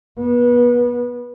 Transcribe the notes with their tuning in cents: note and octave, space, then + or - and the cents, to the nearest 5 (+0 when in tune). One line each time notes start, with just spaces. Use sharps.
B3 -30